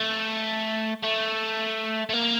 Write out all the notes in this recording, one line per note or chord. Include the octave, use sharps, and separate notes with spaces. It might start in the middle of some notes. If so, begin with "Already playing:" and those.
Already playing: A3
A3
A3
A#3